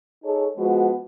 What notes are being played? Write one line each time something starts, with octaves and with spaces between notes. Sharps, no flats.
D#4 G#4 A4 C#5
F3 G#3 B3 F#4